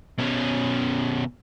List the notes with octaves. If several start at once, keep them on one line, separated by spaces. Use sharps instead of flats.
B2 C#4